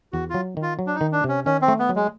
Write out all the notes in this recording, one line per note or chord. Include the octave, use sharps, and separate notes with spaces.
E2 F#4
F#3 F4
D#3
F4
F#3
D4
D#4
D#3
D4
C3 C#4
D#3 C#4
C4
A3
B3
F#3
G#3